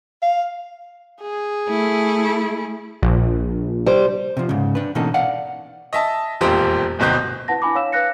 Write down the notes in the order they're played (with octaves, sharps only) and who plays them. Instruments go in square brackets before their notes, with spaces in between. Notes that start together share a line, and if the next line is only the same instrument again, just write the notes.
[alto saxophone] F5
[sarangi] G#4
[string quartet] A3 E4
[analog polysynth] A#1
[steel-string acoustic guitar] G3 C5
[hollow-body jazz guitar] C3 F3
G#2 C#3
D4 B4
B2 E3 A#3 C#4 D#4 A4
D5 F5 F#5
[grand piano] D#5 E5 A5
E1 A#1 F2 F4 G4 C5
D1 G1 B2 C4 G6
[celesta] E4 B4 F#5 A5 A#6
D4 E4 G#5 B5 D6
C#5 F5 E6 E7
B4 F5 F#6 A#6 C#7